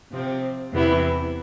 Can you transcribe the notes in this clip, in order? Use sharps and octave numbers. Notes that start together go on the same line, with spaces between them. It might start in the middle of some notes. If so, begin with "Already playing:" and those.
C3 F3 C4 G4
E2 C3 E3 B3 E4